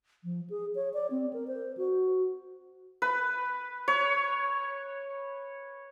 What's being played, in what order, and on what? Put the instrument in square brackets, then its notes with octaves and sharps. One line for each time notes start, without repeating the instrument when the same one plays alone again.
[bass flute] F3
G#4
C#5
D5
C4
A#4
C5
F#4
[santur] B4
C#5